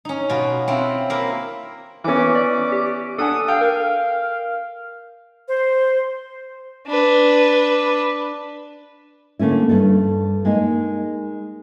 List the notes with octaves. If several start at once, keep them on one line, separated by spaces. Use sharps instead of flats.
C#4 D#4
B2 F4 F#4
C4 C#4 E4 F4
A#3 E4 A#4 E5
E3 B3 C#4 D6
D5
G4
D4 A4 F#5 G#5 D#6
F5 G5
A#4
C5
D4 B4
D3 A3 A#3 C#4 E4
G2 A4
G#3 A#3 D#4